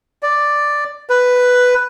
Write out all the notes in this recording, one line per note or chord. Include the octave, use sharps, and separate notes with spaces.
D5
B4